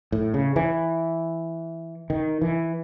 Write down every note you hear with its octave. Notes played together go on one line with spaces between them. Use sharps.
A2
C#3
E3
D#3
E3